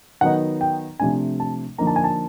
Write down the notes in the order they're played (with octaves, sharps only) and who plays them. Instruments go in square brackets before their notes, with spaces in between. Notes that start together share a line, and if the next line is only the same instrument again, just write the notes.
[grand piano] D#3 F#3 B3 D#4 F#5
G5
C3 F3 A3 D4 G#5
A5
D3 F3 A#3 D#4 A#5
A5
G#5
A5